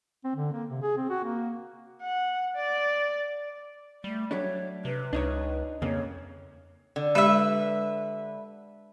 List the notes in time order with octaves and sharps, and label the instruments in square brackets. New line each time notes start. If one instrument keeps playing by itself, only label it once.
[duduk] C4
D3
A#3
C3
G#4
C4
F#4
A#3
[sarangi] F#5
D5
[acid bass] G3 [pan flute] A3
[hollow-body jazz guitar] F#3 A3 D4 [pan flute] C#5
[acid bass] C3 [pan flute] B4
[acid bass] C#2 [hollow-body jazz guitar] D4 D#4 C#5
[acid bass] F2 [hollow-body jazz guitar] C#3 A#3 [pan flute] C#5
[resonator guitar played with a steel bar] D3
[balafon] G#3 G4 [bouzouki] B4 E5